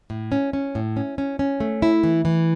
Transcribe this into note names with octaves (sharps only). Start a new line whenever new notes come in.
A2
C#4
C#4
A2
C#4
C#4
C#4
A3
E4
E3
E3